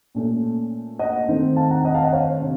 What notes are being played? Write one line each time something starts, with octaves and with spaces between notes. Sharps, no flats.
A#2 A3 C#4
D#5 F#5
D#3 A3 C4 D#4
F5 A5
F#5 A#5
D#5 F#5
F5 A5
D#5 F#5
C#5 F5
C3